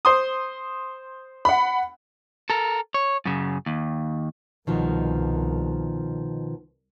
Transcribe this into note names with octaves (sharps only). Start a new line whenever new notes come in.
C5 C6 D#6
F#5 B5
A4 A#4
C#5
F#2 C#3
D#2
C2 B2 D#3 F3